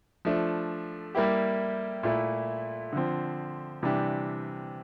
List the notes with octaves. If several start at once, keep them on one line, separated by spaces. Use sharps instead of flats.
F3 A3 D4
G3 A#3 E4 G4
A#2 A3 E4
D3 F3 C4
C3 E3 G3 D4 G4